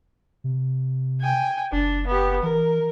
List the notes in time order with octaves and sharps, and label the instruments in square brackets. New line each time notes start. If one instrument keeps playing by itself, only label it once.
[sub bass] C3
[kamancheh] G5 G#5
[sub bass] F#1 [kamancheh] D4
[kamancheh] B3 G4
[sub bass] E3 [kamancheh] A#4